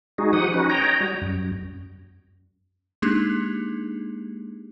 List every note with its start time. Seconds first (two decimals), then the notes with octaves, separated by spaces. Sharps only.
0.18 G#3 D#4 F#4 G#4
0.33 F3 G4 F#5 D#6
0.54 C#4 D#4 F#4 B4
0.70 C#5 D#5 G5 A#5
1.00 G3 F#4
1.22 F#2
3.02 G#3 A#3 D4 D#4 G4 G#4